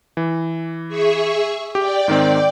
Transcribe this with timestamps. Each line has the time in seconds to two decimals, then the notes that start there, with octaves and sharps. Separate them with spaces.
0.17 E3
0.88 G#4 E5 C#6
1.75 G4 D5 G5
2.08 G#2 D#3 C4